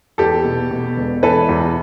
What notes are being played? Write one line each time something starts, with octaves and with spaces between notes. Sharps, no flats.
E2 G4 A4
B2
B2
E1
E3 A4 B4
E2